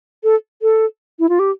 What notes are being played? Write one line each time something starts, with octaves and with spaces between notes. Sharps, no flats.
A4
A4
E4
F4
G4